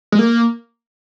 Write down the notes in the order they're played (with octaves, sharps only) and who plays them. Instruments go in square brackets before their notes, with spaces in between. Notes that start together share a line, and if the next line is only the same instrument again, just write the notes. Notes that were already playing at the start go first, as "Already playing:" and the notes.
[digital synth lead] G#3
A#3